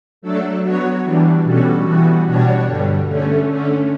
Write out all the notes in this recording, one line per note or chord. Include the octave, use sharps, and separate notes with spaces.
F#3 A3 D4 A4
F#3 B3 F#4 C#5
E3 G3 D4
B2 G3 C#4 F#4 A4
E3 G3 B3 F#4
B2 G3 D4 F#4 C#5
G2 D3 G3
D3 A3 C#4
D3 A3 C#4